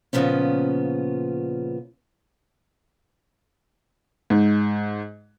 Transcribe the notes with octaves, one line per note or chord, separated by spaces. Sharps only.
A#2 C#3 F3 B3 C#4
G#2